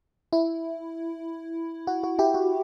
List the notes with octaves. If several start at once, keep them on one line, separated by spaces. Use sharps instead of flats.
E4
F#4
F#4
E4 G4
F#4